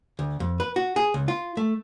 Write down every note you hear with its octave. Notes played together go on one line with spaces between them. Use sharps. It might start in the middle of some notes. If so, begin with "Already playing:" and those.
D2
F2
B4
F#4
G#4
C#2
F4
A3